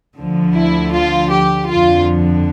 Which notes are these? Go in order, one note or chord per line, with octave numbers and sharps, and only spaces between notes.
D2 D3 F3
E4
F4
G4
F2 D3 F3 F4